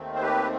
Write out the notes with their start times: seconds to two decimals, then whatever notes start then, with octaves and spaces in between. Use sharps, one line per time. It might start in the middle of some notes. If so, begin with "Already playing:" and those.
Already playing: D#2 D#3 A3 C4
0.15 C5
0.22 G4 B4